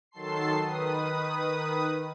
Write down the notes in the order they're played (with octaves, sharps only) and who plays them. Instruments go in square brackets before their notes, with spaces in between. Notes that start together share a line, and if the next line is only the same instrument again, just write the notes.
[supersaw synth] D#3 F#3 A4 A5 C6 C7
D#3 B4 D#6